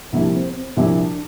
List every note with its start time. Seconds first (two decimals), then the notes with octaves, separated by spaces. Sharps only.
0.13 C2 A#2 F3 A#3 D4 E4
0.34 C4
0.55 C4
0.77 C2 A#2 F3 A#3 D4 E4